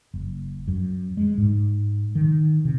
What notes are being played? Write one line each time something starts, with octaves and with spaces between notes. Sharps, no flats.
F#1
F#2
G#3
G#2
D#3
C3